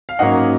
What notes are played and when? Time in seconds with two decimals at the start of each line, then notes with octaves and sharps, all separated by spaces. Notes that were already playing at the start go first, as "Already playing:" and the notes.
0.09 F5
0.19 G#2 F#3 A#3 C#4 D#5 F#5